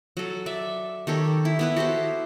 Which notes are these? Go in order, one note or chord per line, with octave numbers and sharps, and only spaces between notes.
F#3 A4
D5 E5
D#3 G4 A4 C#5
E4
B3 E4 B4
F#4 G4 A4 C5